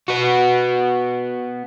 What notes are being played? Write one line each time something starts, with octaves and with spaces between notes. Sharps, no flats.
B3 F#4